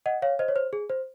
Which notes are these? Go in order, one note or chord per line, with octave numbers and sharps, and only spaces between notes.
D#5 F#5
C#5 F5
C5 D#5
C#5
C5
G#4
C5